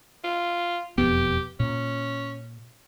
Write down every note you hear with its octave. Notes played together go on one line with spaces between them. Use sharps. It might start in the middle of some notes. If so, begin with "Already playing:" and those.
F4
E1 F2 B3 G4
A#2 C#4